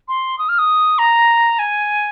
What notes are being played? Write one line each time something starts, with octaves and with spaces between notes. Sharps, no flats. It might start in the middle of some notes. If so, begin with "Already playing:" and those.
C6
D#6
F6
D#6
A#5
G#5